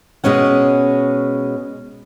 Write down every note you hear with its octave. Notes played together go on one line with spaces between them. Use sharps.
B2 G#3 B3 C#4 F#5